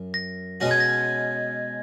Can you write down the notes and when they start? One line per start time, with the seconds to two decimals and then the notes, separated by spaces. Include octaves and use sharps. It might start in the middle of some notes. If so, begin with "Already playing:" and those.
Already playing: F#2
0.14 A#6
0.60 B2 G#3 C#4 F#4 A#6
0.71 G#6
0.80 A#6